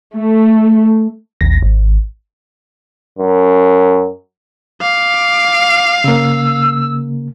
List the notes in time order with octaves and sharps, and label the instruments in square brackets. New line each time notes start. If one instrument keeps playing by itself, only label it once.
[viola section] A3
[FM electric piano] A1 D#2 A#6
G#1
[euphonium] F#2
[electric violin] F5 [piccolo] D6
[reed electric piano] C#3 A#3 [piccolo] E6